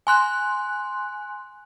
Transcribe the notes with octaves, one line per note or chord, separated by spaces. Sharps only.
G#5 C6 F#6